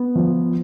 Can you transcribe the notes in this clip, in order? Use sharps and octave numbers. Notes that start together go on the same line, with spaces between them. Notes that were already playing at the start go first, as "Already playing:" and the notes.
Already playing: B3
F3